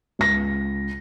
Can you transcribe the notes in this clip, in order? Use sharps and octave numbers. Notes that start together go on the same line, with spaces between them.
C#2 A#6